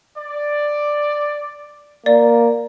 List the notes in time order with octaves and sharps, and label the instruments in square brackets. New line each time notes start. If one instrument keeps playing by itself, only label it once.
[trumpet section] D5
[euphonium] A#3 [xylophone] D5